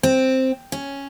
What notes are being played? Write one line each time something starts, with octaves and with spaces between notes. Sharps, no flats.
C4
C#4